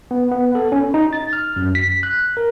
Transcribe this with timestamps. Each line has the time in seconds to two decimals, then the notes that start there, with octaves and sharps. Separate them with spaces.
0.11 B3
0.32 B3
0.55 A4
0.72 C#4
0.94 D#4
1.13 A6
1.33 F6
1.56 F#2
1.75 B6
2.03 F#6
2.37 A#4